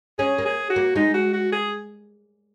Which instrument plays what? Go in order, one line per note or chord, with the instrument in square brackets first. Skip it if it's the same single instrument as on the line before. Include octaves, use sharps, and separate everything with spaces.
[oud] C#4 [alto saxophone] G#4
[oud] A#3
[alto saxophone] G#4
F#4
[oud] A#3
[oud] G#3 [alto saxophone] D#4
[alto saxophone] F#4
F#4
G#4